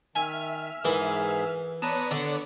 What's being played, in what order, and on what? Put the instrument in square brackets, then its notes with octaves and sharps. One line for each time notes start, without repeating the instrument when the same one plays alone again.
[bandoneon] D#3 [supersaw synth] E5 F6 [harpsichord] G#5
[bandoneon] G#2 G#4 [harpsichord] E3 [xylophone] A#4 B4 B5
[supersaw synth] B3 C#5 D5 [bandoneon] B4 A#5 D#6 [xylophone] A5
[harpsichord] D3 [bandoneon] A4